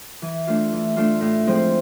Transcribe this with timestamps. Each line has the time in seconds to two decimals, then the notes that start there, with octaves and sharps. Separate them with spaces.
0.22 E3
0.47 A3 D4 F4
0.72 E3
0.96 A3 D4 F4
1.21 A2
1.46 F3 G#3 C4 E4